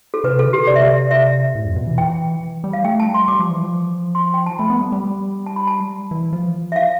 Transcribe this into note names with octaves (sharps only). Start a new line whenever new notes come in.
A4
C3 B4
A4
D3
G4
C3 D5
E5
D5
E5
A2
F2
B2
E3
G5
G3
F5
A3 G5
A5
G3
C6
G3 D6
F3
E3
F3
C6
G5
A5
A3 B5
B3
G3
G3
A5
B5
A5
E3
F3
E5
F5